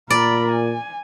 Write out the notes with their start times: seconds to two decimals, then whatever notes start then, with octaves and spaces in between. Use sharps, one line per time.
0.10 A#2 A#4 D5 B5
0.51 G#5